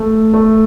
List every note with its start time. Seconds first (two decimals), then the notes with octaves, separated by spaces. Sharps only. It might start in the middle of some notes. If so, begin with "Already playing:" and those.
Already playing: A3
0.34 A3